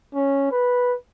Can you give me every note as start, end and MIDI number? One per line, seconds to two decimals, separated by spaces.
0.14 0.49 61
0.52 0.94 71